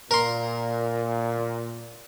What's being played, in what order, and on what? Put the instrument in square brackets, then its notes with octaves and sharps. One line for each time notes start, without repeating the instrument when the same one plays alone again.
[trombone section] A#2 [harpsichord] A#4 C6